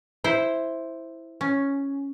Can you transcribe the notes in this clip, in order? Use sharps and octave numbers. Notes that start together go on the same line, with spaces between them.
E4 C5
C#4